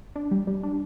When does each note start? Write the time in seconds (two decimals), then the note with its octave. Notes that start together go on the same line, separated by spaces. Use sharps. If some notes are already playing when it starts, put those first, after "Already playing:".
0.16 D4
0.31 G3
0.47 G3
0.63 D4